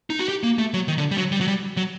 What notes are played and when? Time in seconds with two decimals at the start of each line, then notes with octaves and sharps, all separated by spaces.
0.10 D#4
0.19 F#4
0.29 G4
0.43 A#3
0.58 A3
0.74 F#3
0.88 D#3
0.98 D3
1.11 G3
1.18 F#3
1.32 G3
1.41 F#3
1.48 G3
1.77 F#3